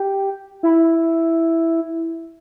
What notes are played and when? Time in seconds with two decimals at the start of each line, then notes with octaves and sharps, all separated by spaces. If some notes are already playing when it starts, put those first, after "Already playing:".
Already playing: G4
0.63 E4